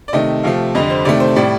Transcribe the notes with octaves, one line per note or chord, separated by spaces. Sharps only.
D5
C3 D#3 A3 D#5
C3 F3 A3 F5
F2 D3 G3 D#5
C5
C3 D#3 A3 D5
C5
A2 G3 D5